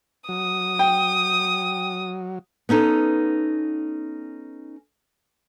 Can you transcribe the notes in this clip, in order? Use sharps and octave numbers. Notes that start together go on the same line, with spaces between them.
F#3 D#6
G5
B3 C#4 D#4 A4